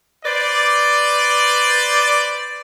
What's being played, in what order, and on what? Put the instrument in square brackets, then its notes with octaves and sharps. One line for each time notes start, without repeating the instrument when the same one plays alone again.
[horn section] B4 C5 D5